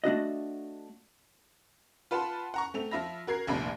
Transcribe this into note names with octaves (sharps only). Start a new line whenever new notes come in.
A3 D4 F#4 D#5
F4 B4 F#5 A5 B5 C6
F#5 A#5 C#6
A3 C4 F7
F3 F4 E5 B5 A#6
F#4 A#4 G#6 C7
F1 A#1 D#2 C3 B5